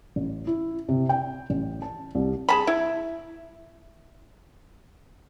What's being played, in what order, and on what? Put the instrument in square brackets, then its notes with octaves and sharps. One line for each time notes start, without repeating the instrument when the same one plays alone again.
[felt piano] A1
E4
C3
G5
A1
A5
C2
[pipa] G#4 A5 B5
E4